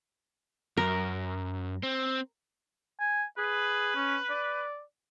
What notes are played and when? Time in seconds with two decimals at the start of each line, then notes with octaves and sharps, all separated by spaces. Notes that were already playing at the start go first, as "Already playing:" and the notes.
0.77 F#2 A#4
1.83 C4
3.00 G#5
3.38 G#4 B4
3.96 C#4
4.30 D5